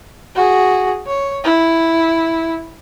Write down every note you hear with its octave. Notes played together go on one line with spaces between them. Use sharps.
F#4 G#4
C#5
E4